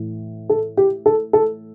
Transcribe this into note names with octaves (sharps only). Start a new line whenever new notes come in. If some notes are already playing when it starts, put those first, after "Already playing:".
Already playing: A2 E3
A4
G4
A4
A4